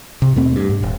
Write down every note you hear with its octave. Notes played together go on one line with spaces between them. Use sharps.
C3
D#2 B2 A3 C4
G2
G#2
D#1